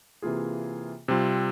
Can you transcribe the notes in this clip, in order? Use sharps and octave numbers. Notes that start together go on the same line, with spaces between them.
C3 E3 A#3 F4 G#4
C3 G3 C4 F4